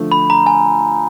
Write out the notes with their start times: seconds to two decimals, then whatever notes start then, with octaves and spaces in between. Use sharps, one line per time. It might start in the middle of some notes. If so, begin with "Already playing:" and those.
Already playing: D3 F3 A3
0.12 B5
0.30 A#5
0.46 G#5